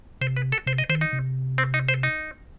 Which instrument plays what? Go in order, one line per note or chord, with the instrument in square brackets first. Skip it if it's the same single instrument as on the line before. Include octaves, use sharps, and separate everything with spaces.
[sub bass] C3 [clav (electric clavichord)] C5
[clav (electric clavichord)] B4
A4
[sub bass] C3 [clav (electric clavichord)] C5
[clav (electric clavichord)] D#5
[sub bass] D#3 [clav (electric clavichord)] C5
[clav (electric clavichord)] D#4
[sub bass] C3
[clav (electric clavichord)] C4
D#4
C5
D#4